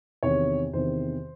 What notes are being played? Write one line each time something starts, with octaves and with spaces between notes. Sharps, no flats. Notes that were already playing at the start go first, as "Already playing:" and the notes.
E2 C3 D#3 C#5
E2 C3 D#3 C5